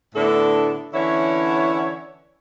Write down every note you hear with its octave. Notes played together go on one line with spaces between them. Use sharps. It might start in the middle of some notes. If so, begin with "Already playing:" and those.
A2 D3 B3 D4 E4 A4
D3 E3 C#4 E4 C#5